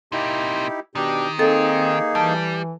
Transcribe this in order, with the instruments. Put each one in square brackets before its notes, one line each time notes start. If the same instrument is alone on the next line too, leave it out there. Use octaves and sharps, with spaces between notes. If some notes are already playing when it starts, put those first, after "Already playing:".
[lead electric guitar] C3 A#3 [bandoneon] D#4 E4 G4
[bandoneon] B2 D4 [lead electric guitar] D#3 [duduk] G4
[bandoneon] A#3 D#4 G#4 [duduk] C4 [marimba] A4
[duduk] E3 [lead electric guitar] G3 [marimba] A5